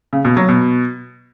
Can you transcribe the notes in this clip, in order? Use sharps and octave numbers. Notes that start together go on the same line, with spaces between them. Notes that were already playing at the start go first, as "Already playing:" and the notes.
C#3
B2
F#3
B2